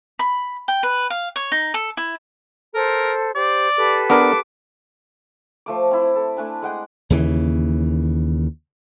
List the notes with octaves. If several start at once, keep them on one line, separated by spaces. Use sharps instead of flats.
B5
G5
B4
F5
C#5
D#4
A4
E4
A4 A#4 C5
G4 C5 D5
G4 A4 B4
B3 D4 A#4 D6
F3 A3 D6
C4 E4
A4
A3 D4 G#5
G#3 F#5 G5
D#2 C#3 E3